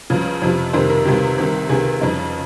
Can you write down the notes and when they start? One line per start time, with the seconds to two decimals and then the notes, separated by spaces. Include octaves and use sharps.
0.10 C#2 C#3 F3
0.42 F2 C3 F3
0.73 F2 C3 D#3 C5
0.89 A#4
1.05 C#2 C3 D#3 G4
1.38 C2 C3 D#3
1.69 C#2 C3 D#3 G#4
2.01 F2 C#3 F3 D#4